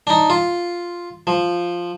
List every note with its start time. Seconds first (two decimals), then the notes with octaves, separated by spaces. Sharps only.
0.07 D4 D#4
0.30 F4
1.27 F3